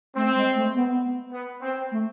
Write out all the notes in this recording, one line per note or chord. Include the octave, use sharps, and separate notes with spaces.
A3 C4
G#3
A3
B3
B3
C4
A3